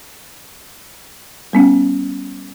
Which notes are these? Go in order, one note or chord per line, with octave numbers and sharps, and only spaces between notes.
G3 B3 C#4